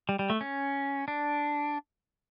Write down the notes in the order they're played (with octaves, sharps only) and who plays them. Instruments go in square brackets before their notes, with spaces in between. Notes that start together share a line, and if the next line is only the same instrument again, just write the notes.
[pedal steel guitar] G3
G3
A3
C#4
D4